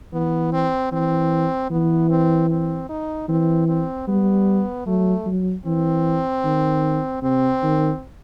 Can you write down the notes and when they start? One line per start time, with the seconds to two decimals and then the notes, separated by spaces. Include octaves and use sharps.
0.13 E3 B3
0.52 C4
0.92 E3 C4
1.71 E3 B3
2.10 C4
2.50 C4
2.89 D#4
3.28 E3 C4
3.68 C4
4.08 G3 B3
4.86 F#3 A3
5.26 F#3
5.65 E3 C4
6.44 D#3
7.23 C3 C4
7.63 D#3